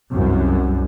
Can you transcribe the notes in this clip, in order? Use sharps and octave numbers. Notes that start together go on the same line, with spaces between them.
C2 F#2